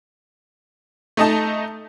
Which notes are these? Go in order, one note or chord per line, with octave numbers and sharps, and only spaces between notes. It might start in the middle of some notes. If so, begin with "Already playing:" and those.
A3 D#4 D#5 A5